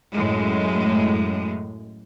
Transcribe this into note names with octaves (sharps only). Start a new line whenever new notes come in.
F#2 A2 G#3